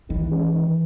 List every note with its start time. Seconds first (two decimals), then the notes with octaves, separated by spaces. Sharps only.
0.09 D#3 E3
0.31 G#3 C#4
0.53 D#3